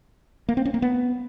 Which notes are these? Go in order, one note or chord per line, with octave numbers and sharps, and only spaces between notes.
A#3
C4
C#4
A#3
B3